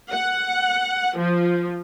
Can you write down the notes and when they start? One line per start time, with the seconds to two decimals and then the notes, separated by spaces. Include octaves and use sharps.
0.12 F#5
1.17 F3